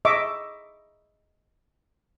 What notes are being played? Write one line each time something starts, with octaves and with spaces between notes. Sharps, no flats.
D#5 E5 C#6 D6